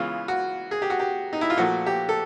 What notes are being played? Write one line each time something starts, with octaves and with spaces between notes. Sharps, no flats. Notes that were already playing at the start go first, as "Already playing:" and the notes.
Already playing: C#3 E3 G#3 B3 F4
F#4
G#4
G4
F#4
G4
D#4
E4
F4
A#2 F3 A3 F#4
G4
A4